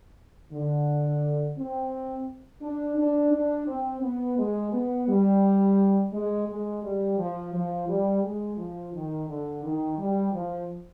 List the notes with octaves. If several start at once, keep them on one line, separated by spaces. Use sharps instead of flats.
D3
C4
D4
D4
D4
C4
B3
G#3
B3
G3
G#3
G#3
G3
F3
F3
G3
G#3
F3
D#3
D3
D#3
G3
F3